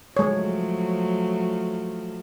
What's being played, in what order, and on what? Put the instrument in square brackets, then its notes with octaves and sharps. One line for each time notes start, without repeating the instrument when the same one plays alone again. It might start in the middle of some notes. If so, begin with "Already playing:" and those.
[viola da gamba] F3 F#3 A3 [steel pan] G#3 C#5